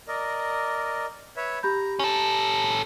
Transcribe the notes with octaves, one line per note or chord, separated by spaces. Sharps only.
A#4 D5 D#5
B4 C#5 E5
G4 A#5 B5 G6
C#4 A4 A#5